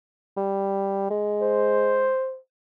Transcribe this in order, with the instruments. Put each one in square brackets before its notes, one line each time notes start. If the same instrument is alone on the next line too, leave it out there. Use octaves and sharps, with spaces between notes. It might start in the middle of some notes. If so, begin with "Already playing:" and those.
[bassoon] G3
G#3
[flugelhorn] C5